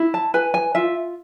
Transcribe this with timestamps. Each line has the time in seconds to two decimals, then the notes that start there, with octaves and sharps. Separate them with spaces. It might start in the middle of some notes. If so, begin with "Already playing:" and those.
Already playing: E4
0.14 A5
0.34 B4 G#5
0.54 G#5
0.75 F4 E5